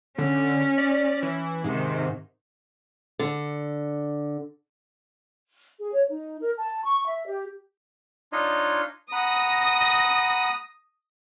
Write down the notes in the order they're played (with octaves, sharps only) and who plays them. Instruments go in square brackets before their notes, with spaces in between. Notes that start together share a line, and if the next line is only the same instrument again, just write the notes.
[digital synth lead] D3 [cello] C#4
[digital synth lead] D5
E3
[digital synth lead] G#2 [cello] C3 D#3
[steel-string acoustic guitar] D3
[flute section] G#4
C#5
D#4
A#4
A5
C#6
E5
G4
[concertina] D4 D#4 F4 C#5 D#5
[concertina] F#5 A#5 B5 [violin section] D#6 A#6